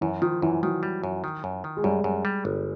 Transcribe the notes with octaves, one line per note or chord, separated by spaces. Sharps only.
F#2 E3
D#3 F3
F#2 E3
D#3 F#3
G3
F#2
D#3
F#2
D#3
G#3
F#2 G3
F#2
G3
G1